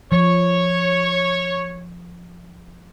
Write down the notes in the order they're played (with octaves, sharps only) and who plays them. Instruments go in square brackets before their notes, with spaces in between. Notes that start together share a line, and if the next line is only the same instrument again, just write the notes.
[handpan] F3 [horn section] C#5